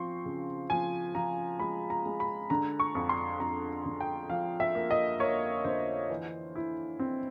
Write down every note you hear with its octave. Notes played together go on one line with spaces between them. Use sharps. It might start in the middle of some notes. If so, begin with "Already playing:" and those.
Already playing: F3 C4 C6 C#6
C#3
F3 G#5
F3 A#5
G#3 B5
A#5
G#3
B5
D3 A#5
C#6
F2
C6
F2 A#5
D3
G5
F3 F5
E5
A#3
D#5
A#3 C#5
D3 C5
E3
E4
C4